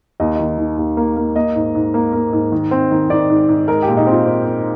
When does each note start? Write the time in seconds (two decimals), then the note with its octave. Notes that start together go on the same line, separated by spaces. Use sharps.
0.20 D#2 D#5
0.36 D#3 D#5
0.58 D#3
0.77 D#2
0.97 A#3
1.17 A#3
1.36 A#3 D#5
1.55 G#2
1.75 G#2
1.94 A#3
2.13 A#3
2.33 G#2
2.52 D#3
2.71 C4
2.91 D#3
3.10 D#3 D5
3.29 G#2
3.48 G#2
3.68 G#3 A#4
3.82 A#2 G4
3.97 D#4
4.06 C4
4.12 F4
4.26 C4
4.45 C4